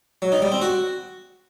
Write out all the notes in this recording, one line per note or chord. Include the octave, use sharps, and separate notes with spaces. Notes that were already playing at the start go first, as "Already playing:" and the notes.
F#3
D#4
G3
C4
F#4